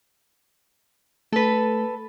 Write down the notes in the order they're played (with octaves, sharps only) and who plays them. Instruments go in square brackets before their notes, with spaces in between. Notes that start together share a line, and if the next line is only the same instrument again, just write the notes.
[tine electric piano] A3 [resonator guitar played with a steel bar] A4 B4